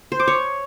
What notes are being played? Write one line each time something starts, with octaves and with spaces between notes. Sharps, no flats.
C5
D6
C#5